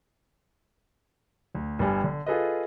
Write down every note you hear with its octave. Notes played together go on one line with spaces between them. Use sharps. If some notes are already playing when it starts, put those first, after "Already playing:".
D2
G1 G3 G#5
D3
F4 G#4 A4 B4 D#5